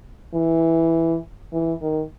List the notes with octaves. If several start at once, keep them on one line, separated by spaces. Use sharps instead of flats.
E3
E3
D#3